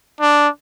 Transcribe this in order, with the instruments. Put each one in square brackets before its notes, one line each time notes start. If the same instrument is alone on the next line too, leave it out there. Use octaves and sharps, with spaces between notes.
[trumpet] D4